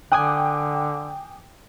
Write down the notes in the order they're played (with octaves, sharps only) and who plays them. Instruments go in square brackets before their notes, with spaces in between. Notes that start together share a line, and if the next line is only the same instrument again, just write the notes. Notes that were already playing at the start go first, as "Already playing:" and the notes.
[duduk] D3 [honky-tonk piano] G5 D6 [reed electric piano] G#5 D#6 F#6